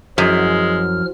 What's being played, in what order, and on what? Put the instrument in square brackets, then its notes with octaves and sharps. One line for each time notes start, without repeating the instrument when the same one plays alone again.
[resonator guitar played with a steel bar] F#2 [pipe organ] F3 F6 [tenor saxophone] G#3 [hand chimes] E4 F#4